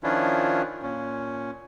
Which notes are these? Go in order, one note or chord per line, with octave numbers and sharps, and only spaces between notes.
D#3 F3 C#4 D4 E4 F4
A#2 C#4